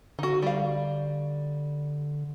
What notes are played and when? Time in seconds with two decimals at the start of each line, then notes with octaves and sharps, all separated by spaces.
0.19 D3 D#4 F#4
0.42 G3 F5